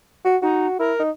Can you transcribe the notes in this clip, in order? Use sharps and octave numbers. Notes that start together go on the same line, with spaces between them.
F#4
D#4 F#4
E4 A#4
D#4